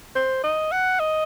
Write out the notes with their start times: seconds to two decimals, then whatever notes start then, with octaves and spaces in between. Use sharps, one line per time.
0.16 C5
0.43 D#5
0.72 F#5
1.00 D#5